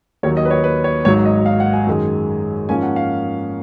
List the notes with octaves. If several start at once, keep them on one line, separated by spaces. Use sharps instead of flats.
D#2 D#3 F#3 C#5
D#5
B4
C#5
B4
C#5
G#1 G#2 F#3 C#5
D#5
F5
F#5
G#5
F#2 D#3 G#3
G#2 F3 A#3 C#4 G#5
F#5
F5